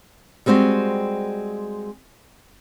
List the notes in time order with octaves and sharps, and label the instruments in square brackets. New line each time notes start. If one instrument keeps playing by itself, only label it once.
[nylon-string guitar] G3 G#3 C4 F#4 C5